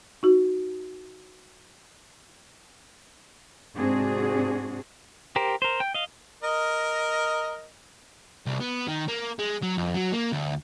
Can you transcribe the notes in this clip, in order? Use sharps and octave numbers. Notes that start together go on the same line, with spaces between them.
D#4 F#4
G#2 C3 C4 D4 F#4 G#4
G4 A#4 C5
A#4 C5
G5
D#5 F5
A#4 D#5
C2
B3
D#3
A#3
G#3
F#3
F2
F#3
A#3
D2